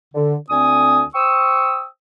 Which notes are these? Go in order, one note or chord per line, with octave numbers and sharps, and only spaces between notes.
D3
D2 D3 C4 G#5 D#6
C5 G5 C#6 D#6 E6